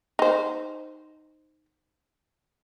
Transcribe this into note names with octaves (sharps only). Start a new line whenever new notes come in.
D#4 C5